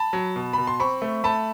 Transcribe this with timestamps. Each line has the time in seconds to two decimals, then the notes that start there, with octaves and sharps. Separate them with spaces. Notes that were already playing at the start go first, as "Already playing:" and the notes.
Already playing: A5 B5
0.13 F#3
0.36 B2
0.53 B2 B5
0.67 C6
0.80 C4 B5 C#6
1.02 A3
1.24 A3 A5 B5